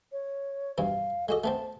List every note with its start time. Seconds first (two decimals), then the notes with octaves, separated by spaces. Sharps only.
0.12 C#5
0.78 B1 G2 E3 F5
1.29 G#3 F#4 A4 D#5
1.44 A3 B3 C4 A5